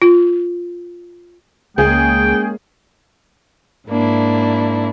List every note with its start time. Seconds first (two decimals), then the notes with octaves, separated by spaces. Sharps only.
0.02 F4
1.78 C#2 G#3 A#3 C#4 G#4 G5
3.89 G#2 A#3 D4 E4